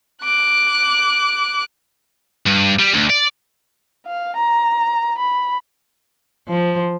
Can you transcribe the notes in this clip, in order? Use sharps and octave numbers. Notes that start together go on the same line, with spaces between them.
D6 F#6
G2
G3
D2
D5
F5
A#5
B5
F3